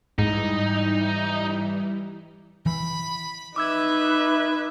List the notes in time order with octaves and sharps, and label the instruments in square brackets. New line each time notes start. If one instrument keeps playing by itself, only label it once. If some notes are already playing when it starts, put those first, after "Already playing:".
[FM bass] G#2 [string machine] E3 G3 E4 [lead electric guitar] D#4
[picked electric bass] E3 [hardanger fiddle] B5
[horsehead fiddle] D#4 B4 [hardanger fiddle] E5 [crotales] D6 E6 G#6